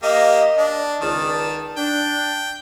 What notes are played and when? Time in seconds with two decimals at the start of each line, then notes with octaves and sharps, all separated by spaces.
0.03 A#3 G4 D#5
0.58 D4
1.01 C#2 D#3 D5 A5
1.77 D4 G5